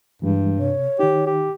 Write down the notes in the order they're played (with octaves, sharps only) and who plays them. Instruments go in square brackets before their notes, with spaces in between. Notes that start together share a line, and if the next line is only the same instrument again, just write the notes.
[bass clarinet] G2 [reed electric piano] E3 G3 G#3
[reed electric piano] C3 [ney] C#5
[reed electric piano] D#3 D#4 [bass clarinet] G4
[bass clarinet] G4